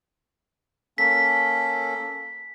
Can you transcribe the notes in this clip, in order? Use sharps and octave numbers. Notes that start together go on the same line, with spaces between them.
A#3 C#4 A4 B6